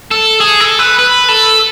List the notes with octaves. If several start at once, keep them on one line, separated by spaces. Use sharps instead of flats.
A4
G#4
A4
B4
B4
A4